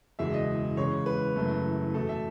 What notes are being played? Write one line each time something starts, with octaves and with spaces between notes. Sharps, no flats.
F#1 E2 B2 G#3 E5
D#5
E2 C#3 G#3 C#5
B4
F#1 F#2 E3 A3
E2 B2 A3 A4
E5